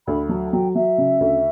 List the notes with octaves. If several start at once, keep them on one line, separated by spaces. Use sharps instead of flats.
D2 B5
F#3 A5
F#3 G5
F#3 E5
C#3
D2